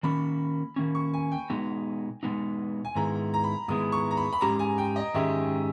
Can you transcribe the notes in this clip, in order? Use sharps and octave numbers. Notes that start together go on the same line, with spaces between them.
D#3 A#3 C#4 B5
D#3 A#3 C#4
C#6
G#5
G5
B2 G#3 B3 D#4
B2 G#3 B3 D#4
G#5
G#2 D#3 G#3 B3 E4 A#5
A#5
B5
G#2 D#3 G#3 B3 E4 D#6
C#6
A#5
B5
B5
G#2 D#3 G#3 C#4 G4 A#5
G#5
G5
D#5
G#2 D#3 G#3 C#4 G4 E5